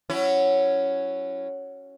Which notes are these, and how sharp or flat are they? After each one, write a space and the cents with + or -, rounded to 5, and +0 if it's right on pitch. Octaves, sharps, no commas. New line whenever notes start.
F#3 +0 C#4 +0 E4 +20